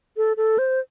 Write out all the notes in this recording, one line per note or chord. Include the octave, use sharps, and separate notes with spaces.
A4
A4
C5